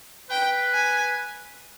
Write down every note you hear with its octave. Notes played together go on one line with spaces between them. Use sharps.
B4 G5
G#5